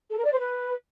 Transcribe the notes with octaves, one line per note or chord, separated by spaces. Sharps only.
A4
A#4
D5
C5
B4